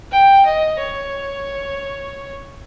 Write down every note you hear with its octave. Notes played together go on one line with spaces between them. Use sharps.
G5
D#5
C#5